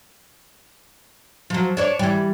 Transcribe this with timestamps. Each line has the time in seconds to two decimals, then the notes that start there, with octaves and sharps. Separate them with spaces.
1.50 F3 F#3
1.77 D4 C#5 D5
1.99 E3 G3